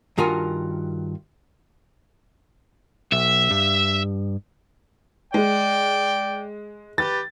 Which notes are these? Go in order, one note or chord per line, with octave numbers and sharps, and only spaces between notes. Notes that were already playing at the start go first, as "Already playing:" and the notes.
G2 D#3 F4 F#4 A#4 G#5
B1 E5
G2
G#3 D5 G5
G4 B4 A6